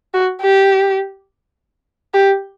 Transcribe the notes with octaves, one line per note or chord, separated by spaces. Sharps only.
F#4
G4
G4